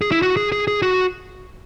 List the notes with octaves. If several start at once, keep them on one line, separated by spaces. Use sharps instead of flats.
G#4
E4
F#4
G#4
G#4
G#4
F#4